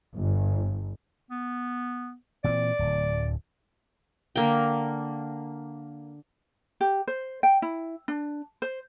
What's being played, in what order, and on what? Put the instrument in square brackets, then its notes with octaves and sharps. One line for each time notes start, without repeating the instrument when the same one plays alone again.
[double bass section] G1
[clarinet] B3
[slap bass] A#2 E3 C4 [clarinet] D5
[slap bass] D1 D2
[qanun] D3 A#3 G5
[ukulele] G4
C5
G5
E4
D4
C5